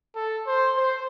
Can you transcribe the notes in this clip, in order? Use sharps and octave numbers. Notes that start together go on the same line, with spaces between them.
A4
C5
C5